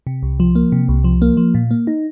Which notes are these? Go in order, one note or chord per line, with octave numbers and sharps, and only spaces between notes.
C3
C2
F3
A#3
C3
C2
F3
A#3
F3
A#2
A#3
D#4